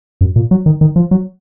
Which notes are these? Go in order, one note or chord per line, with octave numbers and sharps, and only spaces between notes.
F#2
A#2
F#3
D#3
D#3
F3
F#3